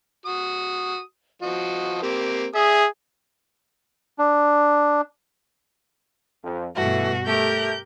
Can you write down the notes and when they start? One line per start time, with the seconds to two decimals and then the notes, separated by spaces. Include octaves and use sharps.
0.26 F#4 D#6
1.42 F3 F#4 D#5
2.02 A#3 C4 G4
2.55 G#4 E5 D#6
4.19 D4
6.44 F2
6.76 G2 B2 E3 A3 F#4
7.26 A3 G4 A#4 G6